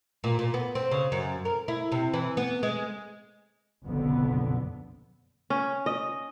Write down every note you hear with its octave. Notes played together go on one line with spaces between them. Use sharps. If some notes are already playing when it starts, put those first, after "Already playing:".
A#2
A#2
B3
C4
C#3
F#2
A#4
E4
C3
E3
B3
G#3
F#1 B1 F2 D3 B3
C#4
D#5